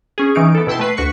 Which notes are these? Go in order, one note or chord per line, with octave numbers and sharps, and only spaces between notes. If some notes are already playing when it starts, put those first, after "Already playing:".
C#4 G#4
E3 C#4 D#4 D7
B3 A4
B2 E4 G5 A5 C6
A3 B4 C7
D2 F#4 C#6 B6 C#7